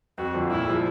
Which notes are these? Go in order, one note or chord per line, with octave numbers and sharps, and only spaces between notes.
F2 F#4
D3 F3
A#2 E4
F3 G#3